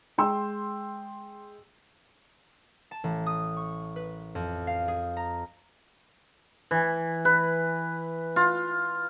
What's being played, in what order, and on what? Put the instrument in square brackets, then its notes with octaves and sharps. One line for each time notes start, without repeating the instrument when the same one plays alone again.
[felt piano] G#3 G5 C6 E6
[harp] A5
A1
D#6
C#6
B4
F2
F5
G#4
A#5
[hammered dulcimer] E3
B4
F4